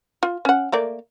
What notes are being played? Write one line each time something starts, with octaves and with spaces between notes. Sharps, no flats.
F4
C#4 F#5
A3 A#3 D5